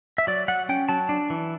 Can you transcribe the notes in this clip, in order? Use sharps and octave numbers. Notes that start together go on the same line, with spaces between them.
E5
F#3 D5
F#3 F#5
C#4 G5
F#3 A5
D4
E3